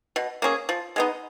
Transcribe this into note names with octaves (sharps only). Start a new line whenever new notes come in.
B2
A#3 C#4 G#4
F3
G#3 B3 D#4